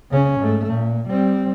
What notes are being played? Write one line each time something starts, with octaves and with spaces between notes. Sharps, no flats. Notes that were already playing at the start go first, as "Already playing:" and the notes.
C#3 C#4
G#2 A3
A#2
G3 C4